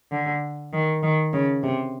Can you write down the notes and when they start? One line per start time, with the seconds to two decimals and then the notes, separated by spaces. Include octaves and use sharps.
0.11 D3
0.73 D#3
1.02 D#3
1.33 C#3
1.63 C3